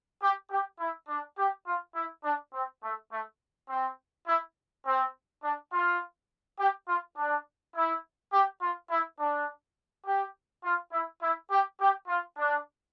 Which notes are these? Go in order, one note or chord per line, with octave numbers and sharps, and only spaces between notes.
G4
G4
E4
D4
G4
F4
E4
D4
C4
A3
A3
C4
E4
C4
D4
F4
G4
F4
D4
E4
G4
F4
E4
D4
G4
F4
E4
E4
G4
G4
F4
D4